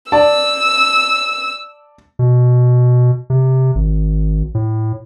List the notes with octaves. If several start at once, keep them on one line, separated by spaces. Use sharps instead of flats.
D5 A5 E6
B2
C3
G#1
A2